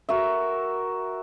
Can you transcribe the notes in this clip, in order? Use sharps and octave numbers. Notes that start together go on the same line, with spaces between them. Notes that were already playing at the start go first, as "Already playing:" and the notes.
F#4 A#4 E5